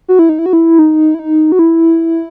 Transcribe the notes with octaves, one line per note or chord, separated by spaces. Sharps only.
F#4
E4
D#4
E4
F#4
E4
D#4
E4
D#4
F#4
E4